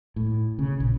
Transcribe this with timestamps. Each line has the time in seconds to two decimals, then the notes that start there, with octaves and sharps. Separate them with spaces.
0.16 A2
0.59 C#3
0.80 A#1